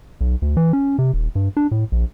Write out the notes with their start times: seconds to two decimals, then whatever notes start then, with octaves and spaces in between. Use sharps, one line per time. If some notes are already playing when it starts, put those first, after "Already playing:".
0.21 B1
0.42 D2
0.57 E3
0.73 C#4
0.99 C3
1.13 D#1
1.35 G2
1.57 D4
1.71 A2
1.92 A#1